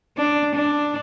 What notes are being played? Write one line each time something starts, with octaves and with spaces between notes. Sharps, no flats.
D4
D4